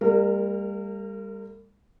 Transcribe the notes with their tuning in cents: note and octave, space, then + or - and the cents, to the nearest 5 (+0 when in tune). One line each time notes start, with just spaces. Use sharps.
G3 +35 A#3 -40 A#4 -10